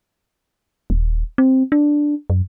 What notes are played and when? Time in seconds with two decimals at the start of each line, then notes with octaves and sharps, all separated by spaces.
0.90 D#1
1.38 C4
1.72 D4
2.30 F#2